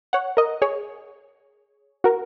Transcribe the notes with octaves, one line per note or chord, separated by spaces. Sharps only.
C#5 F#5
A#4 D#5
G#4 C#5
F#4 A#4